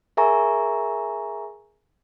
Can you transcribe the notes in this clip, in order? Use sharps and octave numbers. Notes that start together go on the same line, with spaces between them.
G#4 A#4 E5 G#5 A#5 C#6